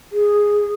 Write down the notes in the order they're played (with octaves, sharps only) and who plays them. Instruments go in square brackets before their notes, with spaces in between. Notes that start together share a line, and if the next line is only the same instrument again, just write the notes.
[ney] G#4